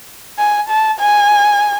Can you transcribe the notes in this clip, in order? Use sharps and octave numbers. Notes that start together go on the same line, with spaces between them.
G#5
A5
G#5